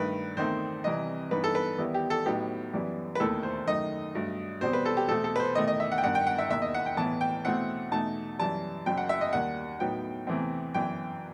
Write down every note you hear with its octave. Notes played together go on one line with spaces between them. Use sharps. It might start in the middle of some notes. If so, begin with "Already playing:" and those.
Already playing: G2 D#3 A3 D#4 B4
E2 D#3 A3 C4 D#4 C5
C2 C3 E3 G3 D#5
G2 E3 B3 D#4 B4
A4
B4
E2 D#3 G3 B3 E4
G4
A4
A1 A2 F#3 B3 D#4 G4
F#2 E3 G3 B3
B4
E1 D#2 D#3 A3 E4 A4
C5
F#2 D#3 A3 D#4 D#5
G2 F#3 A3
E2 B2 G3 C4 C5
B4
A4
G4
E2 B2 A3 C4 A4
A4
B4
C5
E1 E2 D#3 A3 D#5
D#5
E5
F#5
G5
G1 G2 D#3 F#5
G5
F#5
E5
E1 D#2 D#3 E5
D#5
F#5
G5
B1 A2 E3 B3 A5
G5
E2 B2 A3 C4 E4 F#5
E2 B2 A3 D#4 A5
F#2 E3 G3 A5
F#1 F#2 F#3 G5
F#5
E5
D#5
D#2 D#3 G3 F#5
A2 F#3 B3 D#4 G5
E2 C3 E3 A3 C4
G1 F#2 E3 G5